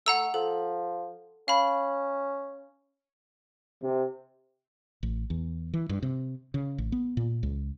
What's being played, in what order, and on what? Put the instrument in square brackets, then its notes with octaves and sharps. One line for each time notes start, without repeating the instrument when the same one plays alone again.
[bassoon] A3 [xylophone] F#5 A#5 E6
[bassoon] F3 [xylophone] A4
[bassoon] C#4 [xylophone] F5 B5
[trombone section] C3
[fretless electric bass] A1
E2
E3
G2
C3
C#3
A1
B3
A#2
C#2